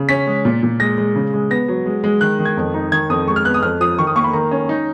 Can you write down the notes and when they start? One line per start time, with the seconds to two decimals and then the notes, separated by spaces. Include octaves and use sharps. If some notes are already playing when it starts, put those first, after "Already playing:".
Already playing: C#3
0.09 C#4 B6
0.27 G#3
0.45 A#2
0.63 A#2
0.80 G#3 A#6
0.98 G#3
1.16 C#3
1.34 G#3
1.50 B3 A#6
1.68 F#3
1.86 G#3
2.04 G#3
2.21 D#3 F#6
2.39 D#3
2.45 G#6
2.57 F2
2.74 D#4
2.92 D#3 G#6
3.10 F2 D#6
3.27 G#3 C#6
3.36 F6
3.45 B3 F#6
3.54 D#6
3.62 F2 F6
3.80 F3 D#6
3.98 D#3 C#6
4.07 D#6
4.15 A#3 C#6
4.24 B5
4.34 D#3 A#5
4.51 C#4
4.69 D#4